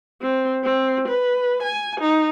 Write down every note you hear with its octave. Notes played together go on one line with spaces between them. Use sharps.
C4
C4
B4
G#5
D#4